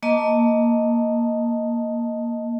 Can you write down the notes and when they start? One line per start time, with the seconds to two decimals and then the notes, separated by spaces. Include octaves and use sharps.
0.03 A#3 D#5 A5